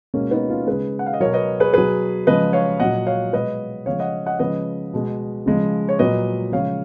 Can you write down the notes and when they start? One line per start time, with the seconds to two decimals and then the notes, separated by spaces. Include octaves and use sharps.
0.14 B2 G#3 A#3 C#4
0.31 B3 D#4
0.49 C#4 F4
0.67 C#3 G#3 G#4 B4
0.99 F#5
1.06 F5
1.13 D#5
1.20 B2 F#3 A#4 C#5
1.34 B4 D#5
1.60 G#4 B4
1.73 B2 F#3 G#4 B4
2.27 C#3 F3 G#3 B4 D#5
2.53 C#5 F5
2.80 A#2 F#3 D#5 F#5
3.07 C#5 F5
3.33 B2 G#3 B4 D#5
3.86 C#3 F3 G#3 C#5 F5
4.00 D#5 F#5
4.26 D#5 F#5
4.39 C#3 F3 G#3 B4 D#5
4.93 B2 G#3
5.46 C#3 F3 G#3
5.89 C#5
5.99 A#2 F#3 B4 D#5
6.52 C#3 F3 G#3 C#5 F5